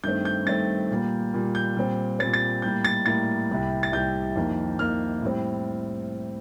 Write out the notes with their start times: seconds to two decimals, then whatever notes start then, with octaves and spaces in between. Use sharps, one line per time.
0.04 G2 D#3 A3 C4 G6
0.25 G6
0.46 G2 D#3 A3 C4 A6
0.91 A#2 G3 A#3
1.34 A#2 G3 A#3
1.55 G6
1.77 A#2 G3 C4
2.19 A#2 G3 C4 A6
2.33 A6
2.62 A2 G3 A#3 G6
2.85 A6
3.06 A2 G3 A#3 A6
3.50 C2 C3 G3
3.83 A6
3.92 C2 C3 G3 G6
4.36 F2 D#3 A#3
4.79 F2 D#3 A#3 F6
5.22 A2 G3 C4